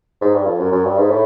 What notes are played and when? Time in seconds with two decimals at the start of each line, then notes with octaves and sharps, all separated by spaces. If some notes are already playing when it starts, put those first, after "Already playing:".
0.21 G#2
0.35 G2
0.47 F2
0.60 F#2
0.72 F#2
0.84 G2
0.97 G#2
1.10 A2